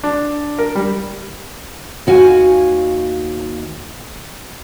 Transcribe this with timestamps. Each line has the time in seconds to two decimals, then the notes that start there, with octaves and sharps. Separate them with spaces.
0.04 D4
0.59 A#4
0.75 G3
2.07 D#2 F#4 F5 G#5